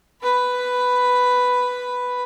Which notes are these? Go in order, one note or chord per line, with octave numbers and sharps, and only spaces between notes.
B4 B5